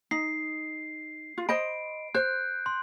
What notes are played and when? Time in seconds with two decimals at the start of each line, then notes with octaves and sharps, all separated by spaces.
0.11 D#4 C7
1.38 F4
1.49 C5 D#5 B5 D7
2.15 C5 F#6 G6
2.66 C6